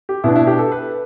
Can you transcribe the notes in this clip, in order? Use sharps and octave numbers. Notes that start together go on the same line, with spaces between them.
G4
B2 B3 D4 E4
E4
G4
A4
B4